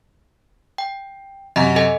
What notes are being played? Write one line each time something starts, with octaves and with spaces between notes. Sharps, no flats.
G5
F#2 C3 D#5 F#5 A#5
A4 D#5 G#5